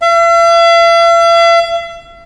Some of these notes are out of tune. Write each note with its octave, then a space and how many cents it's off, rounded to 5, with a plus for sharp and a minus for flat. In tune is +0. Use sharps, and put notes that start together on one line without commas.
E5 +45